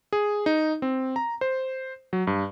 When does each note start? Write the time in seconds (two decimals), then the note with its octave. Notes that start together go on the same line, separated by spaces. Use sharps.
0.13 G#4
0.46 D#4
0.82 C4
1.16 A#5
1.41 C5
2.13 F#3
2.27 G2